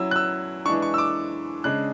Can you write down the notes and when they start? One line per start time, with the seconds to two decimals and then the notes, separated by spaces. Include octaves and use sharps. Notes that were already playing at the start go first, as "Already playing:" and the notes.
Already playing: F#3 C#4 E4 E6
0.11 F#6
0.16 E6
0.65 E3 G#3 D4 C#6
0.82 C#6
0.94 E6
0.98 D6
1.64 C#3 G#3 D4 F#6